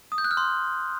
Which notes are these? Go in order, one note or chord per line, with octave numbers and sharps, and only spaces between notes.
D#6
G6
F#6
F6
C6